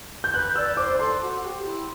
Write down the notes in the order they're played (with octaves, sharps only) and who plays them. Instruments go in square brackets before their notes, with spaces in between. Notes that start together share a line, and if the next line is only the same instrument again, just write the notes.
[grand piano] G6
[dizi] B4 [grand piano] F#6
[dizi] D5 [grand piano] E6
[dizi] C5 [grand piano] D6
[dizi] A4 [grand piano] C6
[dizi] F#4
G4
E4